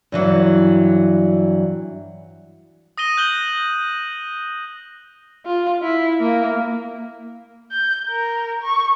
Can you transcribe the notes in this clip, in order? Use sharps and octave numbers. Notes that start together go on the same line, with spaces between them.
G2 E3 F#3
D#6 A#6 D#7 G7
F#6 G6 F#7 G7
F4
E4
A#3
G6
A#4
C#6